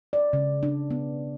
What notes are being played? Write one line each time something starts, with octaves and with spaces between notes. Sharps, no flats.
D5
C#3
D4
B3